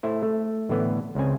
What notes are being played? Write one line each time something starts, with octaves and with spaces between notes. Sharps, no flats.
A3 E4 C5
A3
A2 D3 E3 B3
C#2 C#3 C4 G#5